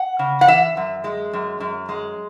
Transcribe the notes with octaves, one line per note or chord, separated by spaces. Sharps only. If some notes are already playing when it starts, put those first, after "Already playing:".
Already playing: F#5
C#3
F#5
E3 E5
F#2
G#3
F#2
F#2
G#3